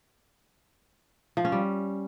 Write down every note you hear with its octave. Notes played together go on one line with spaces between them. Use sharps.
F3
C#4
G3